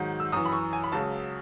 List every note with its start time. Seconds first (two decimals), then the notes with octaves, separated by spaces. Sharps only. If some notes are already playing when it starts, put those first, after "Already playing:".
Already playing: G#2 D#3 F#3
0.20 E6
0.32 F#2 E3 D#6
0.46 B5
0.52 C#6
0.73 G#5
0.84 B5
0.92 C#2 C#3 F#3 A5